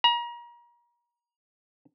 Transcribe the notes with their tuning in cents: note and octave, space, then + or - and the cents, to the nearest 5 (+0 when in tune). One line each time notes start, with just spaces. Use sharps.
A#5 +35